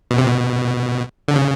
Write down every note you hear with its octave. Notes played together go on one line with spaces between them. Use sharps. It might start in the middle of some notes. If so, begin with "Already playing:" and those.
B2
C3
B2
D3
C#3